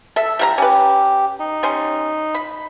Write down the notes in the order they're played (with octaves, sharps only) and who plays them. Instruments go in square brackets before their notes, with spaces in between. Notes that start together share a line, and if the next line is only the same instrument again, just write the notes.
[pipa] A4 E5
G3 A#4 A#5
[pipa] C#4 B4 [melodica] G4
[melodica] D#4
[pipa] G3 C#4 C6
B5